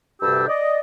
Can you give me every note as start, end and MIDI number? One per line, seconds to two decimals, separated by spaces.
0.22 0.47 38
0.22 0.47 43
0.22 0.47 48
0.22 0.47 62
0.22 0.47 67
0.22 0.47 88
0.47 0.78 74
0.47 0.78 75